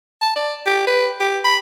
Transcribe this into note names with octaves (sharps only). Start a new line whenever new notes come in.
A5
D5
G4
B4
G4
B5